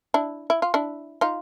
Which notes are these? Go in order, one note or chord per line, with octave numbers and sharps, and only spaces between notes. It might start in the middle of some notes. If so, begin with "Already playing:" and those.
D4 E4
E4
F4
D4 E4
D#4 F4